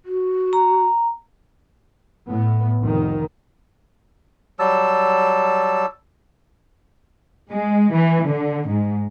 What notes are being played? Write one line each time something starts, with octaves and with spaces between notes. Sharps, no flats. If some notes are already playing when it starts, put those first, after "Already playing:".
F#4
A#5
A2 B3
F1 D#3
F#3 G3 A5 E6
G#3
E3
D3
G#2